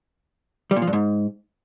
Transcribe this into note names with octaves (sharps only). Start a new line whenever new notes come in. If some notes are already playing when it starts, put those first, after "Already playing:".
G3
A#2
F3
G2
G#2